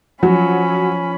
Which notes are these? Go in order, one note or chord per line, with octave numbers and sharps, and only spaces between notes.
F3 F#3 C#4 B5